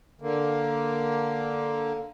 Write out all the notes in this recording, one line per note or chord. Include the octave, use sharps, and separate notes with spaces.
D3 A#3